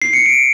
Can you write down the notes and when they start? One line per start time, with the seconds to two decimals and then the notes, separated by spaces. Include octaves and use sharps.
0.02 C7
0.13 C#7
0.26 D7